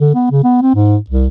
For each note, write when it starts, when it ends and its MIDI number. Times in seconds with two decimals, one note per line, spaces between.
0.01 0.12 50
0.15 0.28 59
0.31 0.44 49
0.44 0.60 59
0.62 0.73 60
0.75 0.97 44
1.10 1.28 36